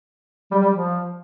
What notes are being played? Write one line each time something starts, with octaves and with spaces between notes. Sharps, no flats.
G3
G3
F3